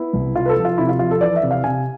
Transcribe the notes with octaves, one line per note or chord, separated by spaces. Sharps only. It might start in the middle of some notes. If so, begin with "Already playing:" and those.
Already playing: B3 E4
C2
C3 F4
B4
A4
F3
F4
C3 E4
F4
F3 F4
A4
E3 D5
E5
C3
F5
C3 G#5